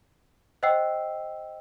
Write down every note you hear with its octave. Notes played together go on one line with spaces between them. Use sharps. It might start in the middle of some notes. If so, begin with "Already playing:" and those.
C5 D#5 F#5 G5 E6 C7